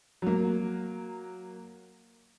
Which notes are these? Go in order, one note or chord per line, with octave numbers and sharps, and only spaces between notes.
F#3 A#3